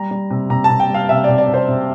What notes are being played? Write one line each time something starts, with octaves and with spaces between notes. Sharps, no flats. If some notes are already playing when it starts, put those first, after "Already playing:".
Already playing: G3 A#5
G3
C3
C3 A#5
A5
C3
G5
G3 F5
C3 E5
C3 D5
D5
C3
C5
C3